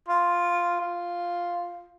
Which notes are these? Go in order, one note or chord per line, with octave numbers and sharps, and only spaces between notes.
F4
F4